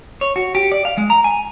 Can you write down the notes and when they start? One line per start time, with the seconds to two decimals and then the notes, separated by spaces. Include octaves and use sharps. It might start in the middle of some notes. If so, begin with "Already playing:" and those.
0.21 C#5
0.36 F#4
0.55 G4
0.72 D5
0.85 F5
0.98 G#3
1.10 A#5
1.24 G#5